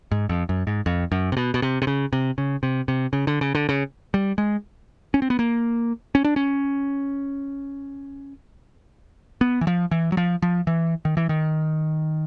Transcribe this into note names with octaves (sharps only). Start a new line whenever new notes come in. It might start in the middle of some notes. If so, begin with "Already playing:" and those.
G#2
F2
F#2
G#2
F2
F#2
C3
B2
B2
C3
C3
C#3
C3
C#3
C3
C3
C#3
D3
C#3
D3
C#3
G3
G#3
C#4
C4
B3
A#3
C#4
D4
C#4
B3
E3
F3
E3
F#3
F3
F3
E3
D#3
E3
D#3